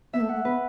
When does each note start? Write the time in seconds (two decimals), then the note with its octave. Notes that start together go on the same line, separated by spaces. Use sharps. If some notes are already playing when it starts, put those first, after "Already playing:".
0.13 B3 E5
0.21 A3
0.29 F#5
0.35 A3
0.45 B3 B4